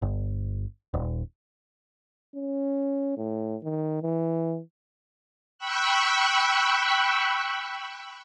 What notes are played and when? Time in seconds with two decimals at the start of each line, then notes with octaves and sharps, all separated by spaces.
0.02 G1
0.94 D#1
2.36 C#4
3.17 A2
3.63 D#3
4.02 E3
5.58 G5 B5 C#6 E6 F#6